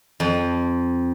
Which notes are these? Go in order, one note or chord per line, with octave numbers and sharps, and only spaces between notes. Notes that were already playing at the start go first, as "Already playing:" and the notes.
F2